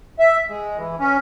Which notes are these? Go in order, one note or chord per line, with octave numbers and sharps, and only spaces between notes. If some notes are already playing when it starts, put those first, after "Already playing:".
E5
G#3
E3
C#4